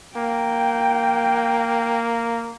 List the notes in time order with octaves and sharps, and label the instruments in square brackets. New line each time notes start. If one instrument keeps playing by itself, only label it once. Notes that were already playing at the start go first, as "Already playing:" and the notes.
[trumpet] A#3 [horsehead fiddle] G5